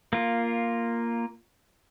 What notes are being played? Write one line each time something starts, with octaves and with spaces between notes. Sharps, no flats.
A#3 F4